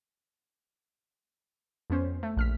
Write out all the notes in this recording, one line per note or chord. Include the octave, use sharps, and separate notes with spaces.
F2 B3 C#4 C5
A3
A#1 F6 B6